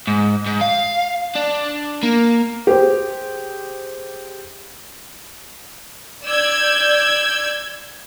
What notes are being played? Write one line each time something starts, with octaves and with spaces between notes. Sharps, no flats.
G#2
G#2
F5
D4
A#3
G4 G#4 C5
D5 E6 G6 G#6